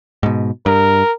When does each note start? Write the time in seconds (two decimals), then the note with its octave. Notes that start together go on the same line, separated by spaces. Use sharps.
0.23 G#2 B2
0.66 G2 A#4